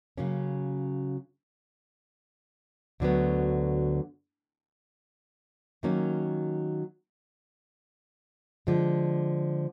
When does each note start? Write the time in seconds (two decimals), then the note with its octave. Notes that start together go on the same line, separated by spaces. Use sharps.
0.17 C#3 F#3 A#3 C#4
3.00 D2 D3 F#3 B3
5.83 D#3 F#3 A#3 C#4
8.67 D3 F3 G#3